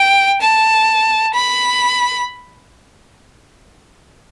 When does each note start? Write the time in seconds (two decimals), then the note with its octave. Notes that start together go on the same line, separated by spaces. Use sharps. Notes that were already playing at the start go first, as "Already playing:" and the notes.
Already playing: G5
0.41 A5
1.35 B5